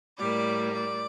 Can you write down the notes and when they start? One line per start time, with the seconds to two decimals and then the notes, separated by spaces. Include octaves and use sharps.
0.18 A2 G3 A#3 D5
0.74 D5